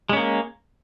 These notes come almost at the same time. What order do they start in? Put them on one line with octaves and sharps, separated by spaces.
G#3 C#4 A#3